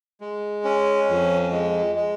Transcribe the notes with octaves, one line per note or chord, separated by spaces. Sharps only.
G#3
C#4
F2
G#3
G#3